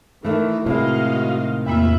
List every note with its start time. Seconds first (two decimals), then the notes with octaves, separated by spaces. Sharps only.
0.25 D#3 E3 A3
0.66 A2 C3 D#3 G#3 E4 F#4 D#5 F5
1.66 E2 A#3 F4 E5 B5